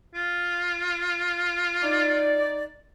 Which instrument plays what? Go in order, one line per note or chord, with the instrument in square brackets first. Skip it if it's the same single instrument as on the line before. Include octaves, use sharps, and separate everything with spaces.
[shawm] F4
[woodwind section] D#4 D5